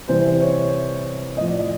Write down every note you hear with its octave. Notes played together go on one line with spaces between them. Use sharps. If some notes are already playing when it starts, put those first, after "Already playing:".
C3 E3 G3 C5
C#5
A2 F3 D#5
D5
D#5